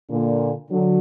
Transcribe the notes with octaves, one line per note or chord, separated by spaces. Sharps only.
A#2 D3
D3 F#3